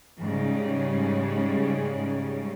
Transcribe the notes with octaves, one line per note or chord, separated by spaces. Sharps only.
G#2 C#3 G3